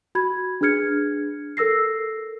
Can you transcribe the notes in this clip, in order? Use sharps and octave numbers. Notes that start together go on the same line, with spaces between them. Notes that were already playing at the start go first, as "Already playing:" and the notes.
F#4 B5 G#6
D4 G#4 B4 F6 G#6 C#7
A4 A#4 E6 A#6 C7